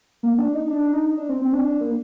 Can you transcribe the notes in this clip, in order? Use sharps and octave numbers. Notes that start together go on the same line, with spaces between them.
A#3
D4
D#4
D4
D#4
D4
C4
C4
D4
D4
A#3